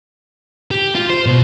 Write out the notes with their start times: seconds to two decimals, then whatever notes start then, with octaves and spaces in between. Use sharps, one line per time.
0.71 G4
0.95 F4
1.10 C5
1.26 B2